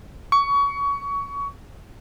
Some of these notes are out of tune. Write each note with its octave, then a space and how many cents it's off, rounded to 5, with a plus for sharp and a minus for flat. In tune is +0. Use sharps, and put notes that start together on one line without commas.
C#6 +25